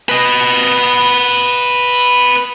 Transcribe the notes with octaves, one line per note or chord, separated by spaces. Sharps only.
B4 D#5